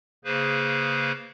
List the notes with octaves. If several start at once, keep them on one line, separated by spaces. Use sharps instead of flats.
C#3 A#3 G#4 B4 C5